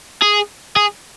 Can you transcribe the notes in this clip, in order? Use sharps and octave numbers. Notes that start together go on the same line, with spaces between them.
G#4
G#4